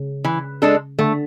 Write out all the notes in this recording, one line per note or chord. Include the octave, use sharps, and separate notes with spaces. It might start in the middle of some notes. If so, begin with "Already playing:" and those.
Already playing: C#3
E3
G#3 D4 A4
D3 A3